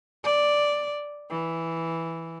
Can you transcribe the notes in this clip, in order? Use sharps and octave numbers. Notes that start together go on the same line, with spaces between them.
D5
E3